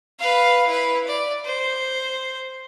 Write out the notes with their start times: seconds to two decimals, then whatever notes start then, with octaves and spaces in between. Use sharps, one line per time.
0.19 B4 F5
0.66 E4 B4
1.07 D5
1.45 C5